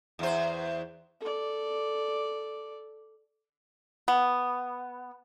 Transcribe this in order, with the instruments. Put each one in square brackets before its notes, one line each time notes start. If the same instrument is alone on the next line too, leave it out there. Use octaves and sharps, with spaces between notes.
[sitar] E2 C5
[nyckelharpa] A4 D5
[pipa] B3